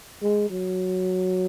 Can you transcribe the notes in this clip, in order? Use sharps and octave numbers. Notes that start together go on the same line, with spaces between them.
G#3
F#3